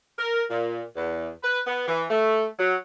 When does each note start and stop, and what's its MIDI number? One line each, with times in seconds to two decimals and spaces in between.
0.18 0.43 70
0.50 0.82 46
0.96 1.29 40
1.43 1.60 71
1.67 1.87 59
1.87 2.04 52
2.10 2.45 57
2.59 2.75 54